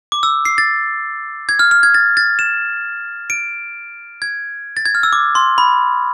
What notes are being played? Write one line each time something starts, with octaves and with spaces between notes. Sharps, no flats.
D6
E6
C7
A6
G#6
F6
F6
G#6
A6
A6
E7
D7
G#6
A6
G#6
F6
E6
D6
C6
B5